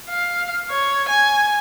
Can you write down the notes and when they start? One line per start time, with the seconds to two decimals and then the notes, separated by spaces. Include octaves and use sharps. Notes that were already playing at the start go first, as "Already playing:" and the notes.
0.10 F5
0.70 C#5
1.09 G#5